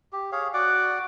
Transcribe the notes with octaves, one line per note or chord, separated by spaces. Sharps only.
G4
G#4 C#5 F5
F#4 D5 F#5 D6